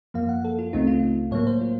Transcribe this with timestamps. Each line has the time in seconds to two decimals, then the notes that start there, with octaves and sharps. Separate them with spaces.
0.14 F#2 F3 A#3 F5
0.29 F#5
0.45 A4
0.59 F4
0.73 C#2 C#3 A3 C4 D#4
0.87 F4
1.31 A2 F#3 A#3 C#5
1.47 C5
1.61 F4